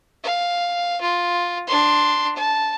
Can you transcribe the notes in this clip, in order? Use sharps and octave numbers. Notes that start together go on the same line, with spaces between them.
F5
F4
D4 C6
A5